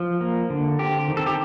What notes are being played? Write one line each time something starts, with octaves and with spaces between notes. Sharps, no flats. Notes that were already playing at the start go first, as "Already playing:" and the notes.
Already playing: F3
A#3
D3
C4 G4
D#3
A4
G4